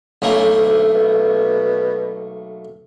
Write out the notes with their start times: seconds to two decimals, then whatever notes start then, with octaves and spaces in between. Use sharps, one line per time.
0.22 B1 A3 A#3 C#4
0.58 D2
0.95 B2